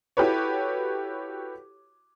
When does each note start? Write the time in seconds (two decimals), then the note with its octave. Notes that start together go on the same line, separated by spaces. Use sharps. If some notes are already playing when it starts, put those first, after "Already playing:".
0.17 E4 F#4 G4 A4 B4 C#5